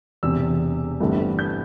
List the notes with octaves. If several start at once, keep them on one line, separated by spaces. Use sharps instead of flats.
E1 E2 C3 E6
G1 G2 E3 A3 C4
G6